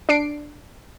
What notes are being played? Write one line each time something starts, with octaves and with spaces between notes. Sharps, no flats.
D4 C7 D7